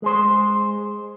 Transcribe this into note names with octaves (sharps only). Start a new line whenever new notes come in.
G#3 G#4 C5